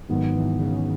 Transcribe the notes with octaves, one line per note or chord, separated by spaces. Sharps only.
G#1 G#2 D#3 F#3 B3
E3
C#3